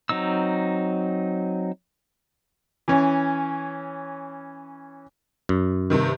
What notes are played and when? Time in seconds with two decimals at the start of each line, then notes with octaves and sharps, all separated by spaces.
0.09 F#3 C4 D#4 E6
2.88 E3 C#4
5.49 F#2
5.90 G2 C3 D#3